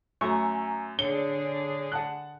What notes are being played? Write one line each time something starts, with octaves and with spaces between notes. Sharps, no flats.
F#2 A3 G#5 A#5 C#6
D3 D4 G#4 C#5 G7
F#5 A5 F#6